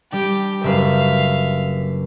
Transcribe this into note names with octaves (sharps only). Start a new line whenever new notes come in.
G3 D4 G4
F#1 G4 B4 E5 F5